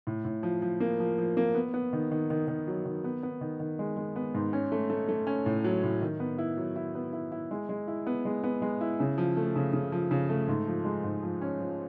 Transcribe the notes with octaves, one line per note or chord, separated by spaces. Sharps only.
A2
A2
F3
F3
A#3
F3
F3
A#3
B3
B3
D#3
D#3
D#3
D#3
F#3
D#3
B3
B3
D#3
D#3
G#3
G#3
B3
G#2
C#4
A3
A3
A3
C#4
A2
F#3
A2
D#3
B3
E4
F#3
E4
B3
E4
E4
G#3
G#3
E4
B3
G#3
B3
G#3
E4
C#3
F3
A3
C#3
C#3
F3
C#3
A3
G#2
F3
G#3
G#2
F3
C#4
F3